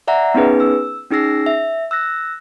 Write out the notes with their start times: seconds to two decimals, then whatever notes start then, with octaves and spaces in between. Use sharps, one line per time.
0.07 D5 E5 F#5 A#5
0.34 B3 C#4 D#4 G#4 B4
0.60 E6
1.10 C#4 D#4 G#4 E6 A#6 C7
1.46 E5
1.91 E6 F#6 A#6